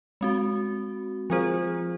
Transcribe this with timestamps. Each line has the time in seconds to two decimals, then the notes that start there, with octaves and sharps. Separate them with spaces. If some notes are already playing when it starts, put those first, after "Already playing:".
0.21 G#3 C4 F#4
1.30 F3 C4 F4 G#4 C5